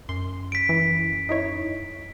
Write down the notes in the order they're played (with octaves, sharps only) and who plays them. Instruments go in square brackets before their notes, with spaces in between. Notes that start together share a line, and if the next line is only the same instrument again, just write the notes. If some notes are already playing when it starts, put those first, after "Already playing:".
[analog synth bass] F#2 [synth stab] C6
[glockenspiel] B6 D7
[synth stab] E3
D#4 E4 C#5